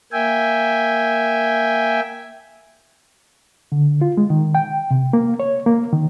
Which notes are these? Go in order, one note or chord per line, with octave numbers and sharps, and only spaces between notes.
A#3 E5 G5 G#5
D3
F4
G#3
D#3
G5
C3
A#3
C#5
A#3
D#3